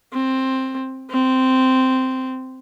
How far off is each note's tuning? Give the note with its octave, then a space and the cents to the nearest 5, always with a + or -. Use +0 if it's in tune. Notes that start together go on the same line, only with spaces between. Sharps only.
C4 +10
C4 -10